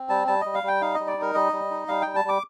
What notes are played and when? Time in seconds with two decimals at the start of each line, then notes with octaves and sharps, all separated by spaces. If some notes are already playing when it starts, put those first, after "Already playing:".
Already playing: C4
0.09 G3 A5
0.27 G3 A5
0.41 G3 D#5
0.54 F5
0.63 G3 G5
0.81 D#4 F5
0.94 G3 D#5
1.07 D5
1.17 D#4 A#4
1.34 G3 D#5
1.53 G3
1.71 D#4
1.88 G3 F5
2.02 G3 G5
2.16 A5
2.24 G3 D6